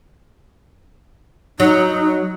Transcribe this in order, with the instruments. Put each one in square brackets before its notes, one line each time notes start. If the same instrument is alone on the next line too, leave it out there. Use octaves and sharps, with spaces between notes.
[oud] F#3 [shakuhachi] D#4